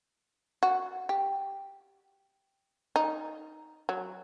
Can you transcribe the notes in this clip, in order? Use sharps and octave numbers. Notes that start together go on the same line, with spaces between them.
F#4
G4
D#4
F#3